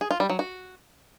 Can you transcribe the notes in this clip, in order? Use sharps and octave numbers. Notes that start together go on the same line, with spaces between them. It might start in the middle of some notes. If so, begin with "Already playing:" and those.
G#4
F4
G3
F#3
F#4